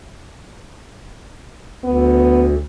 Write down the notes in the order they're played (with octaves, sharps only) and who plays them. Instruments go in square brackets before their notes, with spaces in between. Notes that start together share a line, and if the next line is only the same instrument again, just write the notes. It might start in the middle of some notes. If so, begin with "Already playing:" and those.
[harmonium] D2 [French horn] B3